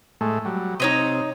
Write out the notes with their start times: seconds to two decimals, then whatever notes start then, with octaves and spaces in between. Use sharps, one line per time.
0.21 A2 G#3 A3
0.45 F#3 G3
0.80 C3 D#4 C#5 D#5